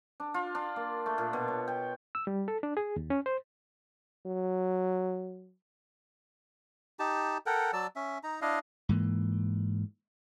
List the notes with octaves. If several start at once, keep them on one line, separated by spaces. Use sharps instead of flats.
D4
F4
D4
A#3
A3
A#2
B2
C#5
G5
E6
G3
A4
D4
G#4
D#2
C#4
C5
F#3
D#4 G4 A5
A4 A#4 F#5 G5
F#3 D5 A5 E6
C#4 E5
D#4 A#5
D4 E4 D#5 F5
G#2 E3 A#3